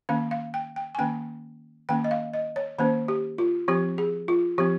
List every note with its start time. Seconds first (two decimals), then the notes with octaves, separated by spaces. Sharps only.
0.09 D#3 A#3 C#4 F5
0.31 F5
0.54 G5
0.76 G5
0.95 G#5
0.98 D#3 A#3 C#4 G5
1.89 D#3 A#3 C#4 G5
2.04 D#5
2.11 F5
2.34 D#5
2.56 C#5
2.78 D#3 A#3 C#4 C5
3.08 G4
3.38 F4
3.68 F3 C4 G4
3.98 G#4
4.28 F4
4.58 F3 C4 G4